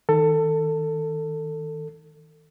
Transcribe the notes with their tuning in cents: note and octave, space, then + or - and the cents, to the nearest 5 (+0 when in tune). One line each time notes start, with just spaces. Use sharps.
D#3 +20 A4 +20